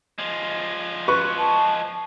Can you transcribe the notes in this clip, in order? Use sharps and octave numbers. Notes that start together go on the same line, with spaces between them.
F3 G#3
B4 C#6
A5